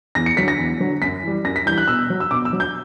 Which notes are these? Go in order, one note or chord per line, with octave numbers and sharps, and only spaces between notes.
E2 A#6
C#7
D3 F#3 B6
A#6
E2
D3 F#3
F#2 B6
E3 G3
F#2 A#6
B6
E3 G3 G6
F#6
B2 E6
F#3
E6
B2 D6
E6
F#3
G6